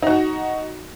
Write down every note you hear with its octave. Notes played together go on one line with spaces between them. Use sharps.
D#4 F#4